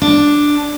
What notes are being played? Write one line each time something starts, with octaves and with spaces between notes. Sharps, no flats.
D4